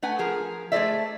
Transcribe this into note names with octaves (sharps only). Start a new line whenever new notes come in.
A3 B4 F#5 G#5
F3 G#4 A#4
A3 G#4 A4 C5 D5 E5